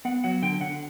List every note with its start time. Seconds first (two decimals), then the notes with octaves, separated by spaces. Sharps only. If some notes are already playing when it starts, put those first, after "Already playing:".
0.05 B3 F#5
0.24 F#3 F#5
0.42 D3 G5
0.61 D3 F#5